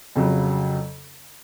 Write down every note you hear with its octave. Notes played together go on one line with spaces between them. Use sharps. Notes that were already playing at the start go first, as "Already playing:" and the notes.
F2 C#3 F#3